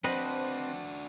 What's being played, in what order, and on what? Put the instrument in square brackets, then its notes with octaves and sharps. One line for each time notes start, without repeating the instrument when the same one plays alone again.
[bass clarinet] F3 [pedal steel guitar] C4 B4 D#5 [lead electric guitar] D4 F#4